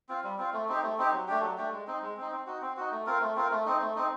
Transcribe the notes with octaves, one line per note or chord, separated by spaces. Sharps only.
C4 F4
G3
C4 F4
A3
C4 D#4 G4
A3
C4 D#4 G4
F#3
A3 D4 G4
F#3
A3 D4 G4
G#3
C4 D#4
G#3
C4 D#4
C4
D#4 F#4
C4
D#4 F#4
A3
C4 F4 A#4
A3
C4 F4 A#4
A3
C4 D#4
A3
C4 D#4